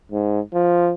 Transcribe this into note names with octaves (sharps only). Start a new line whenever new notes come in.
G#2
F3